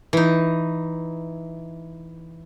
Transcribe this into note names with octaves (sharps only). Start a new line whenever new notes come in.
E3 D#4